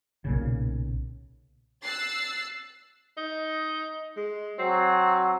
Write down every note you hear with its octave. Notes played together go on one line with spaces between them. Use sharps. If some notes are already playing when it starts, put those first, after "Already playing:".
B1 A#2 C#3
E6 F#6 A6 C7
D#4
G#3
F#3 C4